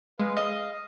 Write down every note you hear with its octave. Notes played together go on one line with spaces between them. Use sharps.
G#3 B4 F5
D#5 F5